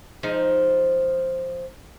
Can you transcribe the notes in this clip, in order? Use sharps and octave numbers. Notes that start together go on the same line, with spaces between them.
F3 G#3 D#4